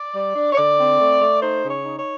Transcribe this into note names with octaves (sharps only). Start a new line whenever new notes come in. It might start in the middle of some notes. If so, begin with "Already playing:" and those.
Already playing: D5
G3
D4
C#5
D3 D5
C4
A3
A3
D#4 C5
C#3
C#5
D#4
C#5